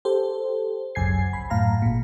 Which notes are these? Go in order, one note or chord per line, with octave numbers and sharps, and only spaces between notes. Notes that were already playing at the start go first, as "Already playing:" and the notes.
G4 A4 C5
G#1 C#2 F#2 G#5 G#6 C7
B5
F#2 A2 F5 A#5
G#1 A#2